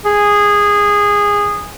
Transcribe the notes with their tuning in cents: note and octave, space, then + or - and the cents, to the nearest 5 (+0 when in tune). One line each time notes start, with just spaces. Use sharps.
G#4 -15